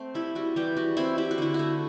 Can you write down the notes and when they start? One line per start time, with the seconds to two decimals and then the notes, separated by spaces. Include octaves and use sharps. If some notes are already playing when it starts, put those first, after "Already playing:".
Already playing: A3 C4
0.15 G3 E4
0.35 G3 F#4
0.56 E3 G3 G4
0.77 G3 F#4
0.97 C4 E4
1.18 E4 G4
1.31 F#4
1.38 D3 E4
1.54 A3 F#4